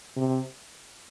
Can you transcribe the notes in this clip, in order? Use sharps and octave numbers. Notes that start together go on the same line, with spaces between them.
C3